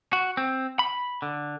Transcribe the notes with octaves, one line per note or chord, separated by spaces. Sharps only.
F#4
C4
B5
D3